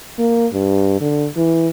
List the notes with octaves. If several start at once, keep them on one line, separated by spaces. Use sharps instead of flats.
A#3
G2
D3
E3